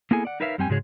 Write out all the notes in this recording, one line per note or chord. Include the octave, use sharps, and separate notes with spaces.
A#3 B3 E4 G#4 A4 G#5
D5 F#5
D#4 A#4 B4 C#5 E5 F5
F#2 G3 C4 G5 G#5
G#2 C#3 G#3 F#4 G#4 C#5